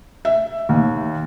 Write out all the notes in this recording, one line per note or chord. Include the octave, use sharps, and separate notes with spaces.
E5
D#2